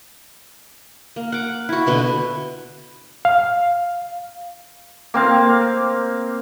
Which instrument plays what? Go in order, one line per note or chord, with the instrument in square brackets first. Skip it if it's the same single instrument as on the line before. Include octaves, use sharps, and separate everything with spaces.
[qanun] A#3
F#5 D6
E4 F#4
B2 D3 B3
[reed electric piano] F5
[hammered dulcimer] A#3 C4 F5